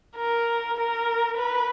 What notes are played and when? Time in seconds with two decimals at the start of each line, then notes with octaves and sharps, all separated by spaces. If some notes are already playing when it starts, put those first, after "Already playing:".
0.17 A#4
0.77 A#4
1.37 B4